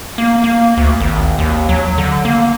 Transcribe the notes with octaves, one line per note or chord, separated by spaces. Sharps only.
A#3
A#3
D2
G#1
D#2
F#3
D3
A#3